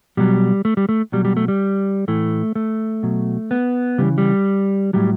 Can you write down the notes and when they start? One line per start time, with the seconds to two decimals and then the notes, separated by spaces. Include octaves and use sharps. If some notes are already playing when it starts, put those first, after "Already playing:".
0.17 B2 F#3 G3
0.65 A3
0.77 G3
0.89 A3
1.12 B2 F#3 G3
1.25 G3
1.37 A3
1.48 G3
2.08 A2 E3 A3
2.55 A3
3.03 B2 F#3
3.51 B3
3.98 C#3 E3 G3
4.18 G3
4.93 A2 F#3 G3